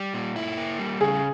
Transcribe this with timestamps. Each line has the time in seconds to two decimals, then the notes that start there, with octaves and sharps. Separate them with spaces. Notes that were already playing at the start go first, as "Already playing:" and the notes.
Already playing: G3
0.14 A#2
0.36 E4
0.57 A#3
0.79 G3
1.01 C#3 G#4